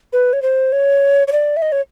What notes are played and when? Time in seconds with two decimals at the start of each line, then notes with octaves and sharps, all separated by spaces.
0.13 B4
0.33 C#5
0.42 C5
0.72 C#5
1.28 C#5
1.32 D5
1.57 E5
1.62 D#5
1.72 C#5